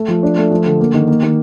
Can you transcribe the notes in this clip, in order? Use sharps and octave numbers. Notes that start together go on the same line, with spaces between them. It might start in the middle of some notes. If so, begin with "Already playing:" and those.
Already playing: A3
F3
D4
A3
F3
D3
A#3
D#3
A#3
D#3